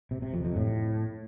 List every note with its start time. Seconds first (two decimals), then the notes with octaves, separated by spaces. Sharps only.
0.11 C3
0.22 C3
0.34 F2
0.45 F2
0.56 A2